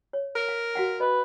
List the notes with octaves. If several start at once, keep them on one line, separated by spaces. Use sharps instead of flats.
C#5
A#4
F5
F#4 F5 F#5
B4 D#5